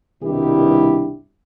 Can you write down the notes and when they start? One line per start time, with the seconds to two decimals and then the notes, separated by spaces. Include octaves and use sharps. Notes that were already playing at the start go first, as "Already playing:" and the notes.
0.22 C2 G2 B2 D#3 E4 G4